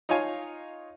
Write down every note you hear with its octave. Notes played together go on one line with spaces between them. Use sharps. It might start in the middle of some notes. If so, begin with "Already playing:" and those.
D#4 F4 C#5 F5 G#5